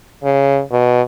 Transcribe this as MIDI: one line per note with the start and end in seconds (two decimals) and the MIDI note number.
0.24 0.60 49
0.72 1.01 47